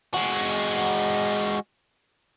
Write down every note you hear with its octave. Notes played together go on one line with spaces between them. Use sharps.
G#3 F#4